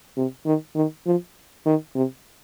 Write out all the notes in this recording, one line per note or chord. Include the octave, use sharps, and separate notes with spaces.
C3
D#3
D#3
F3
D#3
C3